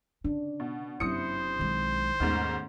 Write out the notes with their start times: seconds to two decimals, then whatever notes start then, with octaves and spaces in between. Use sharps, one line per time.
0.25 C#3 D4
0.60 B2
1.00 F#1 F#2 C3 E4 C5 D#6 C#7
1.59 B1 D#3 G#3
2.20 D#2 G#2 B2 D#3 A3 C#4